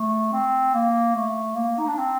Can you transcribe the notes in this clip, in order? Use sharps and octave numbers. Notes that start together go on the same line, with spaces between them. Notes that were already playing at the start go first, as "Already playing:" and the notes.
Already playing: A3
C4
A#3
A3
A#3
D#4
D4
C4